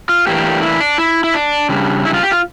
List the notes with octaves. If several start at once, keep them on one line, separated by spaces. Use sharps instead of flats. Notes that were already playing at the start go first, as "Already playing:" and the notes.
F4
A2 E3 A#3 D4 G4
E4
D4
E4
E4
D4
C#3 G3 D4
E4
F4
G4
F4